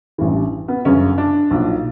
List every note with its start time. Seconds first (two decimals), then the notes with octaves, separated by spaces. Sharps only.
0.18 A1 G2 E3
0.68 B3
0.85 G1 F#2 C#3 C#4
1.18 D4
1.50 B1 A#2 F3